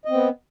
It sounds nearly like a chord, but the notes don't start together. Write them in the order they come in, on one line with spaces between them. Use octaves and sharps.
D#5 C4 B3